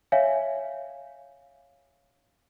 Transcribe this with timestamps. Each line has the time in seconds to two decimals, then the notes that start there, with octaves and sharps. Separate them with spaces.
0.12 C#5 E5 F5 G#5